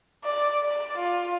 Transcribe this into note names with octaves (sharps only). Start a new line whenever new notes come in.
D5
D5
F4